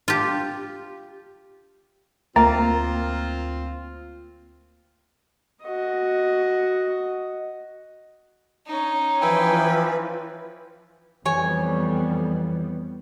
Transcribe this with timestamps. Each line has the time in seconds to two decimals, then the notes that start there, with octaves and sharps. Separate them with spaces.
0.08 F4 G4
2.36 D2 A#3 C4 F4 G5 A#5 A6
5.64 F#4 D#5
8.67 C#4 D#4
9.21 E3 F3 E4 B4 G5 G#5
11.26 F2 E3 G3 B3 C#5 G#5